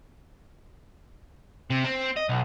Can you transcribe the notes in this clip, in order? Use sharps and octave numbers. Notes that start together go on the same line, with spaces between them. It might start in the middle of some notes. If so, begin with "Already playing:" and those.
C3
C4
D#5
B1